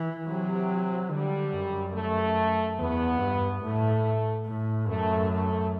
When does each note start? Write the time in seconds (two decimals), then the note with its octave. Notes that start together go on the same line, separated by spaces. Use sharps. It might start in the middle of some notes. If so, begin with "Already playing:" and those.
Already playing: E3
0.26 C3 F#3
1.10 D3 G3
1.52 F#2
1.94 A3
2.78 E2 B3
3.20 G2
3.63 A2 A3
4.46 A2
4.89 F#2 A3
5.30 A3